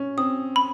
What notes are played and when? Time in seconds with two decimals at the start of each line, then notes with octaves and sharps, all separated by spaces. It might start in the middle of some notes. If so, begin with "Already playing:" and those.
Already playing: C#4
0.17 C4 D#6
0.56 B5